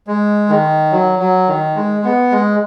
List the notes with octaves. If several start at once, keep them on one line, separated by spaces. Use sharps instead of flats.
G#3
D#3
F#3
F#3
D#3
G#3
B3
G#3